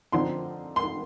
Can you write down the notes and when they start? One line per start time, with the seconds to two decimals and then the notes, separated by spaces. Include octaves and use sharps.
0.12 D3 F3 C4 D#4 C6
0.76 C6